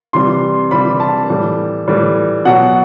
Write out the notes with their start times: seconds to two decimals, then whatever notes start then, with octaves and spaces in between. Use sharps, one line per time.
0.13 C3 E3 G3 C6
0.71 C3 E3 G3 B5
1.00 A5
1.30 A2 E3 G3
1.88 A2 E3 G3
2.45 B2 F#3 F#5